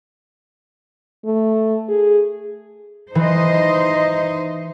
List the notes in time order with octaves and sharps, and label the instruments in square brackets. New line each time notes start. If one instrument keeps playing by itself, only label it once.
[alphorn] A3
G#4
[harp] E3 [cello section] D#4 C5 D#5